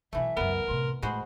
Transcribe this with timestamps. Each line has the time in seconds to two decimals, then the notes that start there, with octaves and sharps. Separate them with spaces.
0.13 B1 B2 E3 A3 E5
0.37 C#2 F#2 B3 A#4
0.67 A2 C3 C6
1.02 E2 A2 G#3 F#4 C5 B5